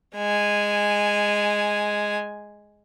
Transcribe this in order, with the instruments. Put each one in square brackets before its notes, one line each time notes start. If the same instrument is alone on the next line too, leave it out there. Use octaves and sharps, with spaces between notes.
[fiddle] G#3 G#5